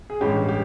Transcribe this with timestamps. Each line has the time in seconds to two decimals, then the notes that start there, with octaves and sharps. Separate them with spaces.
0.10 G#4
0.20 A1 G2 E3 G#3 C#4 G4
0.49 G4